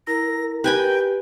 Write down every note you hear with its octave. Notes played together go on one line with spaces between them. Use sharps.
E4 A#4 A#5 A#6
G4 B4 G5 G#5 B5